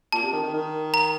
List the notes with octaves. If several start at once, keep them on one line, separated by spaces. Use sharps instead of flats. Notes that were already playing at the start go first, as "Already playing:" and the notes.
A#2 A5
C3
D#3
D#3
D#3
A#5